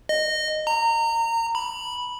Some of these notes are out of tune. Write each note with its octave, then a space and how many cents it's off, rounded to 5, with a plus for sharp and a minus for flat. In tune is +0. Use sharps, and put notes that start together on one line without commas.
D#5 -15
A#5 -25
B5 -10